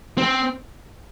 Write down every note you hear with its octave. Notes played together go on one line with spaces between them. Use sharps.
C4